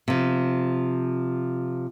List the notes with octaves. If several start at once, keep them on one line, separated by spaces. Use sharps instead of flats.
C3 F3